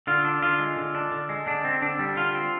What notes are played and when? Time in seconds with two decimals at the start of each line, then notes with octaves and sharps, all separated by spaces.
0.07 D3 F4
0.25 D4
0.42 D3 F4
0.59 G#3
0.77 D3
0.95 D4
1.12 D3
1.29 G#3
1.47 D3 D4
1.64 C4
1.82 D3 D4
1.99 G3
2.17 D3 F4
2.35 C4